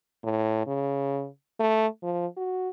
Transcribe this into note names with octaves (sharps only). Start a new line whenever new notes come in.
A2
C#3
A3
F3
F#4